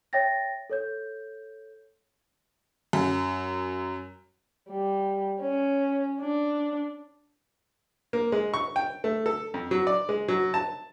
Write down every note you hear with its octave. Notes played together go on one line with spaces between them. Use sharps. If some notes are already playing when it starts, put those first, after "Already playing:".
C#5 E5 G5 A6 A#6
A4 C#5 G6
F#2
G3
C#4
D4
A#3
G#3
C#6
G5
A3
A4
F2
F#3
D5
G#3
F#3
A5